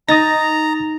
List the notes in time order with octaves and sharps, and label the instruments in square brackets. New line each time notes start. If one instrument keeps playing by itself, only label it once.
[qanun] D#4 [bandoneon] A#5 [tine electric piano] D#6 A6 A#6